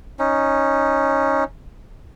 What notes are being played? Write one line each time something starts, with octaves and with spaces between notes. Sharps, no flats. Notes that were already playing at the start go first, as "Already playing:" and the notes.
C#4 D#4